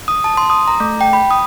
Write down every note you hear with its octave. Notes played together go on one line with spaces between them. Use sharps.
D#6
A5
C6
D#6
A#5
A3
G5
B5
D#6